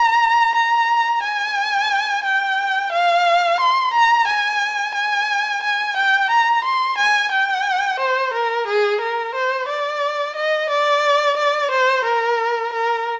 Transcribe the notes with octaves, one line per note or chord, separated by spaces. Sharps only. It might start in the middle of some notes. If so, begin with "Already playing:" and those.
Already playing: A#5
A#5
G#5
G5
F5
C6
A#5
G#5
G#5
G#5
G5
A#5
C6
G#5
G5
C5
A#4
G#4
A#4
C5
D5
D#5
D5
D5
C5
A#4
A#4